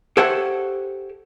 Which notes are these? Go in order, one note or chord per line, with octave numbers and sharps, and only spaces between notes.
G4 A4 C5 C#5 E5 F#5